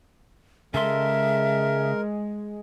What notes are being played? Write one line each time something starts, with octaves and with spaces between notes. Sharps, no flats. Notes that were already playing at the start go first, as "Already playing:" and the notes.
C#3 G#3 A4 A#4 E5 C6